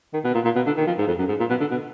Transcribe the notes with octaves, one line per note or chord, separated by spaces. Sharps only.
D#3
B2
A#2
A#2
B2
D3
D#3
F3
G#2
F2
F#2
G#2
A#2
B2
D3
B2